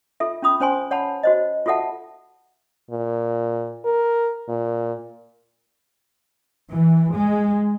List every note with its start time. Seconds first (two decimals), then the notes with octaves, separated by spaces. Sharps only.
0.20 F4 A4 E5
0.42 C#4 F4 B5 D#6
0.60 C#4 C5 G#5 C6
0.91 C#5 F#5 A5 B5
1.23 F#4 C5 D#5
1.66 F4 F#4 A4 E5 F#5 A5
2.91 A#2
3.85 A#4
4.48 A#2
6.70 E3
7.14 G#3